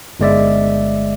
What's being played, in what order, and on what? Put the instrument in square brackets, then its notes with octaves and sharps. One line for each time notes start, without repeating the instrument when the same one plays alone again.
[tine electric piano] G1 G#3 D5 E5